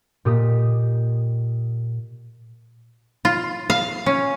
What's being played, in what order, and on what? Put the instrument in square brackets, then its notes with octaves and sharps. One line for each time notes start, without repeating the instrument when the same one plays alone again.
[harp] A#2 G4 D#5 D#6 B6
[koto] F4
F5
C#4